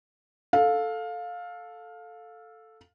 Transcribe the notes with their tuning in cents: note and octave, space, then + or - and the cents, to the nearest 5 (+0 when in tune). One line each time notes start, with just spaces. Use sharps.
A4 +0 F5 +15